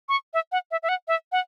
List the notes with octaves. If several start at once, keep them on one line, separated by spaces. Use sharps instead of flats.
C#6
E5
F#5
E5
E5
F#5
E5
F#5